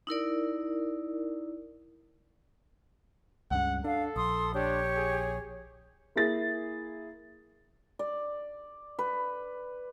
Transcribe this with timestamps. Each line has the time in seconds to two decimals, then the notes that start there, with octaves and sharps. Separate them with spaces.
0.07 D#4 E4 A#4 D5
3.51 C#2 G2 C#3 F#5
3.84 D4 A4 F5
4.16 A#1 C6 D#6
4.54 D4 G4 C#5
4.96 G#4
6.16 A#3 E4 G#4 A6
7.99 D5
8.99 B4